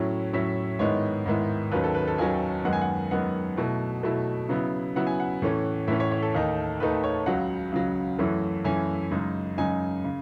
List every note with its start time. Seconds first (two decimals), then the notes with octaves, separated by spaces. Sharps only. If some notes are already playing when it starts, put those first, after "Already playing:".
Already playing: A2 F#3 C#4 E4
0.33 A2 F#3 C#4 E4 E5
0.79 G#2 D#3 G#3 B3 E4 C#5
1.26 G#2 D#3 G#3 B3 E4
1.72 D#2 D#3 F#3 C#4 B4
1.84 A4
1.95 B4
2.07 A4
2.18 D#2 D#3 F#3 C#4 G#5
2.65 F#2 D#3 G#3 B3 F#5
2.73 G#5
2.81 F#5
3.11 F#2 D#3 G#3 B3 F#5
3.57 B2 F#3 A3 E4
4.03 B2 F#3 A3 E4
4.49 C#3 F#3 B3 E4
4.96 C#3 F#3 B3 E4 F#5
5.07 G#5
5.20 F#5
5.42 A2 E3 A3 C#4
5.88 A2 E3 A3 C#4 E5
6.00 C#5
6.12 C#5
6.22 A4
6.34 D#2 D#3 A3 D#4
6.80 D#2 D#3 A3 D#4 B4
7.04 C#5
7.26 C#2 C#3 F#3 F#5
7.72 C#2 C#3 F#3
8.19 F#2 E3 A3 C#4 E4
8.64 F#2 E3 A3 C#4 E4 G#5
9.11 F#2 C#3 G#3 D#4
9.57 F#2 C#3 G#3 D#4 G#5
10.04 C#3